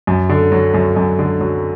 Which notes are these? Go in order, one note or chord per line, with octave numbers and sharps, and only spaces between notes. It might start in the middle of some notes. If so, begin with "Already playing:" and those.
F#2
D3
F#3
F#2
F#2
D3
F#3